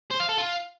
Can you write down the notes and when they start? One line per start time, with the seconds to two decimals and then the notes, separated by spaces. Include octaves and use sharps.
0.11 C5
0.20 F5
0.29 A4
0.38 F4